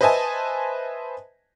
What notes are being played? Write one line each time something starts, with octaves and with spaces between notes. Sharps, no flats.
B4 C5 D#5 E5 G#5 A5